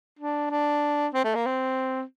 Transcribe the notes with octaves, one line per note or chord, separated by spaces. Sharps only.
D4
D4
C4
A3
A#3
C4